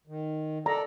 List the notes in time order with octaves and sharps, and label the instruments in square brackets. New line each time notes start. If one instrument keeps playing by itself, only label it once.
[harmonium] D#3
[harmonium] A4 D5 [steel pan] A#5